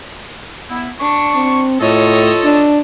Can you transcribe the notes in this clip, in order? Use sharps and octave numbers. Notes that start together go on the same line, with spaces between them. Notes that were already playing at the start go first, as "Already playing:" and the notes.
B3 E4
D4 C#6
C4
A2 F4 A4 C#5 D#5
D4